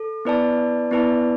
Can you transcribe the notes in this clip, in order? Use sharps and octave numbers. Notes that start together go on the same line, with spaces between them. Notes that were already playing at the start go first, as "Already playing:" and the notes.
Already playing: A4
B3 E4 B4 D5 A5
B3 E4 B4 D5 A5